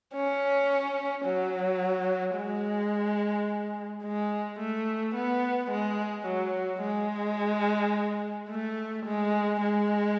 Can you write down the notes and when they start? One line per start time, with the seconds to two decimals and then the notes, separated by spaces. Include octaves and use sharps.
0.14 C#4
1.25 F#3
2.36 G#3
4.04 G#3
4.59 A3
5.15 B3
5.71 G#3
6.26 F#3
6.83 G#3
8.50 A3
9.05 G#3
9.61 G#3